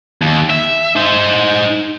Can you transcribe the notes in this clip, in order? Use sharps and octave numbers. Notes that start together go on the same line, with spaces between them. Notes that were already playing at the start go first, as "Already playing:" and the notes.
D#2
E5
D#4 C5